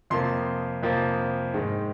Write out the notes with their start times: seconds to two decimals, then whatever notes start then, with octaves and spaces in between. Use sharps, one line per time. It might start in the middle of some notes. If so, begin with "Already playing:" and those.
0.10 F2 C3 F3 A#3 C6
0.83 F2 C3 F3 A#3
1.54 G#2 D#3 G#3